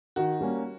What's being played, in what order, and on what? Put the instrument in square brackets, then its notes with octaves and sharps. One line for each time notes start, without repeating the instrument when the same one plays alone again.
[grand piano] D#3 [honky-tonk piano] F#4
[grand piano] G3 A#3 C#4